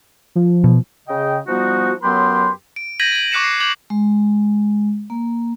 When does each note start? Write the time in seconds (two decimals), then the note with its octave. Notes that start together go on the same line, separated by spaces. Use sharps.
0.35 F3
0.64 B2
1.08 C#3 D#5 G5
1.47 F3 G3 B3 D#4 F#4
2.02 F#2 F#3 B3 G4 B4 C6
2.76 D7
3.00 G6 G#6 A#6 B6 D#7 F#7
3.12 G#6 F#7
3.32 C#6 D6 F#6 B6 C#7 E7
3.44 C7
3.60 D6 G6 G#6 F#7
3.90 G#3
5.10 A#3